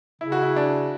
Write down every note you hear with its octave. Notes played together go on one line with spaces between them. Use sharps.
C#3 E4
F#4
E4
D4